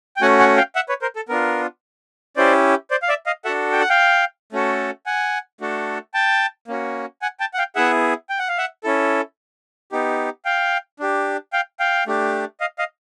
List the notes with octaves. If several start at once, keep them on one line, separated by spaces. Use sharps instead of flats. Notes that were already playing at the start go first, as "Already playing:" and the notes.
G5
A3 C#4 F#4 F#5 G#5
F#5 G#5
F5 G5
E5 F#5
B4 C#5
A#4 C5
A4
B3 D4 F4 A#4
C#4 E4 G4 C5 D5
C5 D5
F5
D5 E5
D#5 F5
D4 F#4 A4 E5 F#5
G5
F#5
F5 G5
A3 C#4 F#4 A4
F#5 G#5
A3 D4 F#4 A4
G5 A5
A#3 C#4 F#4
F#5 G#5
G5 A5
F#5
F5 G5
B3 E4 G#4 E5 F#5
G5
F#5
F5
E5 F#5
C#4 E4 A4
B3 D#4 G4
F5 G5
D4 G4
F5 G5
F5 G5
A3 D4 G4
D#5 F5
D#5 F5